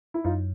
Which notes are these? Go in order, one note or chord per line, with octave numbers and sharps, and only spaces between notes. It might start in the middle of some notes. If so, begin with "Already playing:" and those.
E4
F#2 D#4 F4